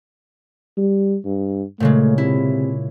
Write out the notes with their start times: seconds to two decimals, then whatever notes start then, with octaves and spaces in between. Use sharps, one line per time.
0.77 G3
1.25 G2
1.80 A#2 C#3 G#3 A3
2.18 C3 E4